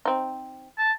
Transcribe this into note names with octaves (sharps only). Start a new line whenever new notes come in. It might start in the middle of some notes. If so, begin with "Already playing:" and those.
C4 D#4
A5